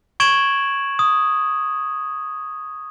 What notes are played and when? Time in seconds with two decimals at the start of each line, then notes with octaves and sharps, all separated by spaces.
0.20 C#6 G#6 D7 E7 F#7
0.99 D#6